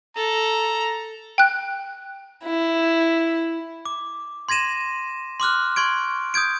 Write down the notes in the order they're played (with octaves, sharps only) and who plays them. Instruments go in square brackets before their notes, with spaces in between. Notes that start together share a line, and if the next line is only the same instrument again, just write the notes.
[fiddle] A4 [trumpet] A#5
[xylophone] G5 F#6
[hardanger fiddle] E4
[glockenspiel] D6
C6 G#6 A#6 D#7 E7
C6 D6 F6 F#6
C6 C#6 G#6 D7
D#6 G6 G#6 D7